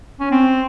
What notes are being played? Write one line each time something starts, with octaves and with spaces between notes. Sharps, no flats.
C#4
C4